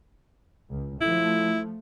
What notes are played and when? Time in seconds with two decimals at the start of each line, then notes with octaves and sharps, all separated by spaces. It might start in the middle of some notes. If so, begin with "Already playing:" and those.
0.70 C#2
1.01 F3 A3 E4